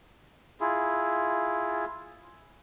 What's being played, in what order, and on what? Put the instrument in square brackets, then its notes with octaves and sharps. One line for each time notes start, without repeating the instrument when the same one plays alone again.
[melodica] E4 F4 G#4